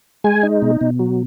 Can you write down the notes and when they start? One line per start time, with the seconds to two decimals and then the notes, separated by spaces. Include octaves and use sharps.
0.24 G#3 G#5
0.43 D#4
0.62 B2
0.81 B2
0.99 F#3